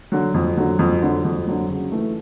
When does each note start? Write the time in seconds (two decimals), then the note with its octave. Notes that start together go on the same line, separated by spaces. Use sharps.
0.12 D3 F#3
0.34 F2
0.57 D3 F#3
0.79 F2
1.02 D3 F#3
1.25 F2
1.47 D3 F#3
1.69 C#3
1.92 E3 A3